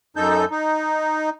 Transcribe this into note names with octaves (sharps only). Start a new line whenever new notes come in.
F#2 D#4 A4 G6
D#4